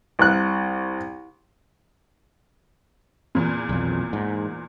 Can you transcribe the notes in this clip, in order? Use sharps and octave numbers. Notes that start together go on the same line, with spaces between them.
C2 F#6
E2 A#2
B1 F2
G#2